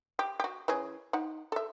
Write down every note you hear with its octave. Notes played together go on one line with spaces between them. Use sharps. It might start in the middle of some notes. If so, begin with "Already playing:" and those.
G4
F#4 G4
E3 C#4 G#4
D#4 F#5
A4 E5